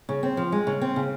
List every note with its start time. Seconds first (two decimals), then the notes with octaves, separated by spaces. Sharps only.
0.09 C#3
0.23 C4
0.37 F3
0.52 G#3
0.67 C#3
0.81 C4
0.96 C#3